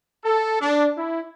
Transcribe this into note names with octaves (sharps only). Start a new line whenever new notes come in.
A4
D4
E4